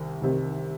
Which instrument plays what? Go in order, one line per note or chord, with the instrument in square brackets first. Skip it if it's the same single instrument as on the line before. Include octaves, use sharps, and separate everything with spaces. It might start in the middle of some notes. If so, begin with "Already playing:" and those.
Already playing: [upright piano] C2 C3 D#3
C2 C3 D#3